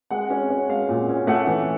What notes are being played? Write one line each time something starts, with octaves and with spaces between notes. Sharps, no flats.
G#3 F#5
C#4
C#4
G#3 F5
A#2
C#4
A3 F#5
E3